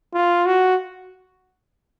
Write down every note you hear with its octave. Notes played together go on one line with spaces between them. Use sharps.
F4
F#4